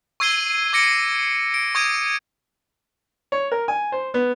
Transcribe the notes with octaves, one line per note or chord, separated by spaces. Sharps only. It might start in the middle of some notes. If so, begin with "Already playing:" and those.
C#6 E6 G#6 C7 D#7 G7
D6 G#6 A#6 C#7 D7
D7
C#6 D#6 G#6 D7 D#7
C#5
A#4
G#5
C5
B3